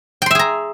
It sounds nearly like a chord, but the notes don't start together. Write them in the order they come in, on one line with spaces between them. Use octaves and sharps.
G5 C6 E5 G#4 A#5